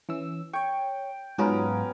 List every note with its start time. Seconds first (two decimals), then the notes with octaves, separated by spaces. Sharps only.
0.09 E3 C#4 E6
0.53 C#5 G5 C#6
1.38 G#2 F#3 B3 C#4 F4 A#4